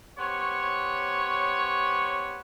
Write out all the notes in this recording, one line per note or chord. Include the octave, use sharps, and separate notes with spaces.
B3 G4 C5 C#5